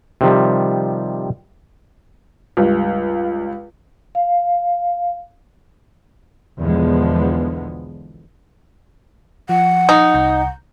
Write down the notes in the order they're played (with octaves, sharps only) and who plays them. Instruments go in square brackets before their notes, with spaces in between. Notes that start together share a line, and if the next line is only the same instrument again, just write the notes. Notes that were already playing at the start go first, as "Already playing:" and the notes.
[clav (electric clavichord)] C3 D#3 F3 G3
[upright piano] C#2 G2
[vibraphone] F5
[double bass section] B1 E2 D3 F3 G#3 B3
[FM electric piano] F3 [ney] F#5
[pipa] D#4
[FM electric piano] C2 A#5 G6